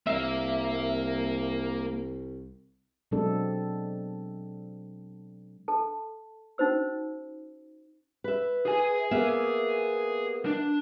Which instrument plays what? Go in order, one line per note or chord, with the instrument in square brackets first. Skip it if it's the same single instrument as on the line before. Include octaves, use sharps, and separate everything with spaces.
[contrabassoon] C2 [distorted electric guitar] A#3 F5 [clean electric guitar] E5
[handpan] B2 F#3 G#3 C4 D4 A4
[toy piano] A4 A5
C#4 D#4 F#4 C5 E6
[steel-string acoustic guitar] B4 E5
[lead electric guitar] G#4 G#5
[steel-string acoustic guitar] A#3 B3 E5
[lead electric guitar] D4